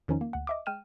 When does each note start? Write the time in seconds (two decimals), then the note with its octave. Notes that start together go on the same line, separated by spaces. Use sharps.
0.08 E2 D#3 F3 C#4 D#4
0.21 A#3
0.33 D2 F#5
0.47 D#5 E5 D6
0.66 G#3 G5 F6 D#7 E7